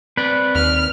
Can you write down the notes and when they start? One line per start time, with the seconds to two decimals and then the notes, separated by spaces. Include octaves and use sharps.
0.17 C4 B4 D5
0.55 D#2 F6